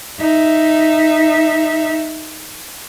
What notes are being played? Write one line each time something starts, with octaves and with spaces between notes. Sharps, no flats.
D#4 E5